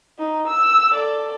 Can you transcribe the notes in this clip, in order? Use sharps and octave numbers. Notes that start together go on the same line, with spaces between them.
D#4
E6
A4 D5